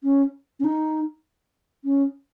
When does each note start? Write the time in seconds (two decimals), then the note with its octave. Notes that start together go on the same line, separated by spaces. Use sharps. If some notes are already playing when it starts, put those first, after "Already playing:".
0.04 C#4
0.60 C#4
0.64 D#4
1.85 C#4